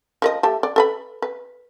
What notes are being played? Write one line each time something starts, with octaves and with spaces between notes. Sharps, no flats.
F3 A#4 D#5
A3 G4 A5
D5
A4 B4 B5
B4